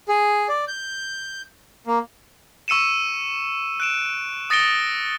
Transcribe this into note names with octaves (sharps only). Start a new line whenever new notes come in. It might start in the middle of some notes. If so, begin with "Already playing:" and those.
G#4
D5
G6
A#3
C#6 E6 C#7 D#7 E7
F#6 D7 E7
D#6 A6 A#6 C#7 D7 G7